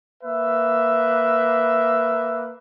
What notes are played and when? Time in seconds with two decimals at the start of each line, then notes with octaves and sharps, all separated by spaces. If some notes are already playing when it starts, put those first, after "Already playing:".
0.24 A#3 B4 E5